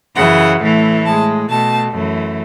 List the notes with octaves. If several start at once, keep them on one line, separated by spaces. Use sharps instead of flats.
F#2 C#3 E3 F#5
A2 E3 A3
A2 G#3 A5
B2 A3 A5
F#2 E3 A3